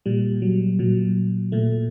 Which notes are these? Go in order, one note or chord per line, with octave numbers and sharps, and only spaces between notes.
A#2 G3
F#3
A#2 F#3
A#2 A3